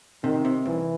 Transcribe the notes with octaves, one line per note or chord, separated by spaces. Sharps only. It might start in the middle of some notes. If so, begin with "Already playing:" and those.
C3 D#3
C3
C2 E3